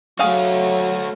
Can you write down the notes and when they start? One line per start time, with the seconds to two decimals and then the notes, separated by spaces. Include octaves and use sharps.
0.19 F#3 A3 F#4 G#4 F5